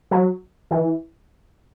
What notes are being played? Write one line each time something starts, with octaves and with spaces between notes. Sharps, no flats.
F#3
E3